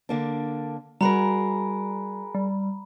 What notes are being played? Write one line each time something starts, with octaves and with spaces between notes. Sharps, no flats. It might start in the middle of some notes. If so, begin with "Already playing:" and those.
D3 A#3 D4
G3 F#4 G#4 A#4 A#5 B5
G3